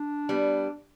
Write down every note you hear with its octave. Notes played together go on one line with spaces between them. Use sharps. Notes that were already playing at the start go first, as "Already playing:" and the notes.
Already playing: D4
G3 B3